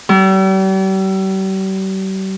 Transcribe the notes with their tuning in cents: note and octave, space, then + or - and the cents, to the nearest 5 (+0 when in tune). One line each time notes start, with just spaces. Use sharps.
G3 -40